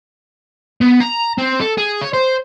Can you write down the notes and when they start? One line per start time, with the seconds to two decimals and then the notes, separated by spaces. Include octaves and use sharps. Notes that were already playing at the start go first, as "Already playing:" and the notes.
0.81 B3
1.00 A#5
1.38 C4
1.60 A4
1.78 G#4
2.02 C#5
2.14 C5